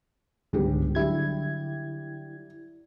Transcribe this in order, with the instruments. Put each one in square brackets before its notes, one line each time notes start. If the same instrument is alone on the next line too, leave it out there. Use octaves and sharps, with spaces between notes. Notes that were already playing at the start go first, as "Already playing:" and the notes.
[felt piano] G1 G4 G#4 [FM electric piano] C#2 G#2 D3
[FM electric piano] D3 E4 G#6 [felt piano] F#3 G3 G4